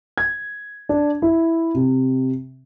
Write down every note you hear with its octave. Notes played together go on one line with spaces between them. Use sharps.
G#6
D4
E4
C3